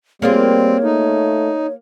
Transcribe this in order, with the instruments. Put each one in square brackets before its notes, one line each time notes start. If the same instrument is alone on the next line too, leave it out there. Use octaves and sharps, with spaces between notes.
[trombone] G3 [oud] A#3 F4 G#4 [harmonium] C4 [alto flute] C#5
[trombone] A3 [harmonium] D#4